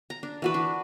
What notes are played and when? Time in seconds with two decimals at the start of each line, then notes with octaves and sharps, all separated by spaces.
0.10 A#5
0.23 D4
0.42 E3 F#4 B4
0.54 D4